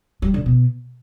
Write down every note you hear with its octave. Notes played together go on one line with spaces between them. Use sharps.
G3
D3
B2